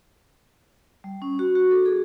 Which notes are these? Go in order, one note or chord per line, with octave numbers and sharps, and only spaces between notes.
G3
C#4
F#4
F#4
A4
G#4